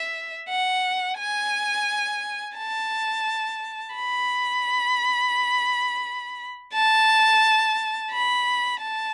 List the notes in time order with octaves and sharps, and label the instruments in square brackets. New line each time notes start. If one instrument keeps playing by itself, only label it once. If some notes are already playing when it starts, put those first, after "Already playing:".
Already playing: [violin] E5
F#5
G#5
A5
B5
A5
B5
A5